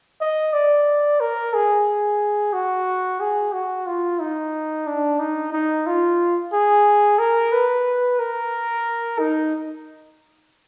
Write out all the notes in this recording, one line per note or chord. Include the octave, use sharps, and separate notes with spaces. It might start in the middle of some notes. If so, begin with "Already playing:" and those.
D#5
D5
A#4
G#4
F#4
G#4
F#4
F4
D#4
D4
D#4
D#4
F4
G#4
A#4
B4
A#4
D#4